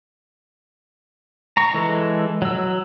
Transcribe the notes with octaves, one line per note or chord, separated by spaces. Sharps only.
A#5 C#6
E3 G#3 A4
F#3 E6